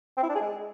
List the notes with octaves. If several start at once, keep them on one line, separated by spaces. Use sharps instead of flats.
C4
E4
D4
G#4
G#3